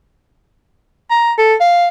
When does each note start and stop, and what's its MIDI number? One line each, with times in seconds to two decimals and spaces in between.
1.10 1.32 82
1.38 1.54 69
1.61 1.88 77